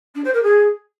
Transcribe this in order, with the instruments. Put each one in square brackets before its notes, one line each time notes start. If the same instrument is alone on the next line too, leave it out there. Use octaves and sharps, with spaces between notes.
[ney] D4
C5
A#4
G#4